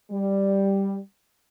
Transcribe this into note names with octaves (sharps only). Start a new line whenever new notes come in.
G3